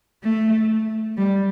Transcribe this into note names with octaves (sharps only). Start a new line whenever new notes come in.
A3
G3